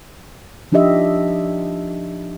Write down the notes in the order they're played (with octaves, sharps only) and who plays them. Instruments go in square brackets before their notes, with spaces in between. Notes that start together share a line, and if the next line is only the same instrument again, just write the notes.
[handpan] F3 D4 D#4 G4 D#5 E5